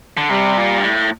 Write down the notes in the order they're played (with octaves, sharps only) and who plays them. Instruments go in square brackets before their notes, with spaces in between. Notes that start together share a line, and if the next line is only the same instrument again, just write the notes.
[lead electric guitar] D3
[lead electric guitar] C3 [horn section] G3
[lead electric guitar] A#2
G2
A2